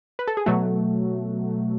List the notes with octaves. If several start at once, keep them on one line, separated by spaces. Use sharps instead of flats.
B4
A4
G#4
B2 F#3 A3 F#4